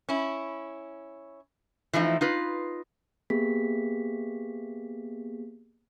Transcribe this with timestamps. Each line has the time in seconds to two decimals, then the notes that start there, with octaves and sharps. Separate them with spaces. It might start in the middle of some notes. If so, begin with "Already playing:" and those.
0.09 C#4 E4
1.93 E3 F3 A3 D#4
2.21 D#4 F4 B4
3.30 A#3 B3 G4 G#4 B6